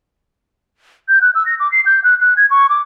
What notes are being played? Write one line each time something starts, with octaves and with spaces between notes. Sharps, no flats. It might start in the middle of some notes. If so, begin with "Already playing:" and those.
G6
F#6
E6
A#6
D6
C7
G6
F#6
F#6
G#6
C#6
D6